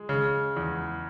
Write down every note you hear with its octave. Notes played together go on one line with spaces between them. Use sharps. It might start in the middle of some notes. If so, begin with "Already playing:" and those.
Already playing: G#3
C#3
E2